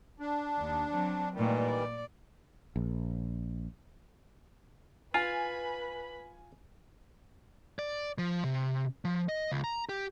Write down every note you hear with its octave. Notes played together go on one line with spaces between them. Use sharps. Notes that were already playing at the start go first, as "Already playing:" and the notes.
D4
D#2
F#3 C4
A#2 D#3 E3 G3 A3
D5
A#1
F4 B4 G#5 B5
D5
F3
C3
F3
D#5
C#2
A#5
G4